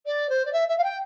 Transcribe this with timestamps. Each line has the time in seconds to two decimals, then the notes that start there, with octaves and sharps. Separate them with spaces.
0.05 D5
0.29 C5
0.45 D5
0.52 E5
0.68 E5
0.77 F5
0.83 G5